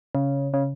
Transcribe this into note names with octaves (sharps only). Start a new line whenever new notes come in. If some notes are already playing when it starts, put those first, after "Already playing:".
C#3
C#3